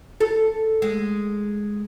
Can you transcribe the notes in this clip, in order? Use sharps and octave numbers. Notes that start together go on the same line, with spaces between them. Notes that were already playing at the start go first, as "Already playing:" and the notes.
A4
G#3